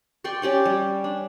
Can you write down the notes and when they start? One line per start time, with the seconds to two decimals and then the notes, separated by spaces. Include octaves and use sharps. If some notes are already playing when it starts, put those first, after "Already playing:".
0.24 D5 G5 C6 C#6
0.42 C#4 G4 D5 C#6
0.65 G3
1.04 D4